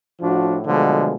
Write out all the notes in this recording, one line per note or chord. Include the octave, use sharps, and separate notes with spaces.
A2 F3 D4 F#4
B2 D3 F3 F#3 G#3 A3